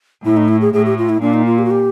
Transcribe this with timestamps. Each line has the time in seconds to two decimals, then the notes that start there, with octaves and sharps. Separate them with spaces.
0.24 A2 E4
0.37 D#4
0.48 E4
0.61 G#4
0.73 A2 G#4
0.85 G4
0.98 F4
1.09 E4
1.21 A#2 D4
1.34 D#4
1.46 F4
1.58 G4
1.65 F#4
1.71 G4